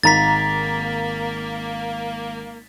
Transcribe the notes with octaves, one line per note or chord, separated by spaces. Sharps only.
G#1 A#3 A#5 A6 B6